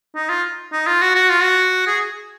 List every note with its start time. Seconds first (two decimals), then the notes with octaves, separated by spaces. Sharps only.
0.15 D#4
0.29 F4
0.72 D#4
0.87 F4
1.02 F#4
1.15 F#4
1.29 F4
1.42 F#4
1.87 G#4